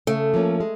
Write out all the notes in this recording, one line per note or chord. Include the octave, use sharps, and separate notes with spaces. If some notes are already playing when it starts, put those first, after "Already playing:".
C#3 A3
F3 A#3 C#4
G#3